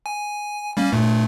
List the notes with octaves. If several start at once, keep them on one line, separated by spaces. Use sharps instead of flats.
G#5
G3 A#3 C#4
G2 A#2 A3